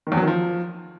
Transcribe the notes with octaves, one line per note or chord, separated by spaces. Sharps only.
D#3
E2
F#3
D#3
F3